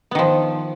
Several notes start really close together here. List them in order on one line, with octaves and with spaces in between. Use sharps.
B3 D#3 F3